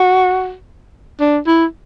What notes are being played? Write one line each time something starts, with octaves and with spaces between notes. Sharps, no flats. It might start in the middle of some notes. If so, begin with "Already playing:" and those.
Already playing: F#4
D4
E4